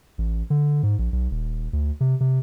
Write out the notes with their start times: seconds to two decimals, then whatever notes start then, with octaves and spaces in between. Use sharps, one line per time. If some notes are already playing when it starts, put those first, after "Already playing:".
0.18 A1
0.50 D3
0.83 G#2
0.99 A#1
1.12 B1
1.31 D#1
1.73 D2
2.01 C3
2.20 C3